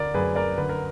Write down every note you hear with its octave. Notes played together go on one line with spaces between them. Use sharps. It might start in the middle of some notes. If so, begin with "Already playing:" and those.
Already playing: D2 D3 A#4 D5
F#2 G#4 B4
A#4 D5
D3 B4
A#4